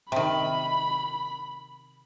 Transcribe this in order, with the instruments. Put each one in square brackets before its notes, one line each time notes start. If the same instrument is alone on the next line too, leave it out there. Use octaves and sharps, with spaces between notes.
[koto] C3 D#3 [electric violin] B5